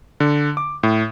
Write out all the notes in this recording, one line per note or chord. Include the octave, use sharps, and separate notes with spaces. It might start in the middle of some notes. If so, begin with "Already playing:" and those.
D3
D6
A2